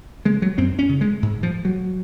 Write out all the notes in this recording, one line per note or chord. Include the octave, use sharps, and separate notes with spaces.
C#3 G#3
F#3
F#2 C4
C#4
C#3
G#3
G#2
F3
F#3